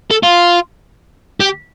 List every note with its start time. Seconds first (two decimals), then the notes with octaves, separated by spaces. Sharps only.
0.11 A4
0.23 F4
1.40 G4